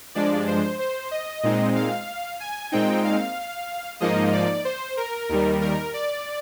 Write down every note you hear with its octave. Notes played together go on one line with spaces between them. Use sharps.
G2 F3 G#3 D4 D5
C5
C5
D#5
A#2 G#3 C4 D#4
F5
G#5
A#2 G#3 C4 D#4 G5
F5
G#2 F3 A#3 D#4 D#5
D5
C5
A#4
D#2 D#3 G3
A#4
D5